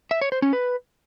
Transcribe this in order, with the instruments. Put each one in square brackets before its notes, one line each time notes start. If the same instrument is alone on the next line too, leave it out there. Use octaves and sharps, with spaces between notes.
[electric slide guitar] E5
C#5
C5
C#4
B4